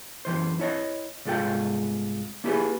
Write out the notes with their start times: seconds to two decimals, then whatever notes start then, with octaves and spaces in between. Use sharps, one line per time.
0.25 F#2 E3 C5
0.59 E4 C#5 D#5
1.25 C2 G#2 G#3 F4 A4 G5
2.44 A#3 E4 G4 G#4 B4